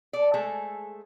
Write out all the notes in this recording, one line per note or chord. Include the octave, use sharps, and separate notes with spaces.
A4 D5
G#3 A3 G#4 A4 C5